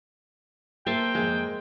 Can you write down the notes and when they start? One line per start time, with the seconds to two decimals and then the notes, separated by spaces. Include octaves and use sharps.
0.86 A#3 A4 C5 E5 G5 A5
1.15 F2 G#2 G#3 A#3